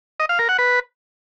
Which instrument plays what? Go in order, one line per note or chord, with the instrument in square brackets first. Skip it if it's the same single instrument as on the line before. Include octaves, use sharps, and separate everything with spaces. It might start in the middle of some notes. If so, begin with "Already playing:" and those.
[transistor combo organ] D#5
F5
A#4
F#5
B4